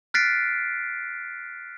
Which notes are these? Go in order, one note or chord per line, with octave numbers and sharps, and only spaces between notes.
F6 F#6 A6 B6 C7 D7